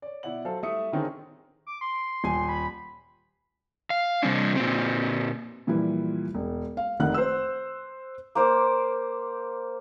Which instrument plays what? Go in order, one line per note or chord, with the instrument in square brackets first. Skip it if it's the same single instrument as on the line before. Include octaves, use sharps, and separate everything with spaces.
[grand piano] C#5 D5
B2 E4 D5 F#5 F#7
F#3 A4 C5 F5 A5
G3 A3 E4 E5 D#6 C#7
D3 D#3 C4 C#4 D#4 G#4
[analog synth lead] D6
C6
[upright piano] D#1 G#5
[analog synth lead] B5
[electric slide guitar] F5
C3 G3 C4 D4
A#2 C4
[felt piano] A#2 E3 F3 G3 E4
E1
F5
F1 D#3 F#5 F#6
C5 E6
[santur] A#3 C5 D6